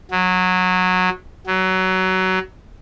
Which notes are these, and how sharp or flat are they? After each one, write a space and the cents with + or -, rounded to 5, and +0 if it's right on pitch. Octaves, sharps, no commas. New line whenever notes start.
F#3 -15
F#3 +20